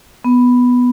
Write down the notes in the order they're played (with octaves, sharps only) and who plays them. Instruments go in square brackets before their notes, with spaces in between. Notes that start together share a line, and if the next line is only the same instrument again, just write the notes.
[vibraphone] B3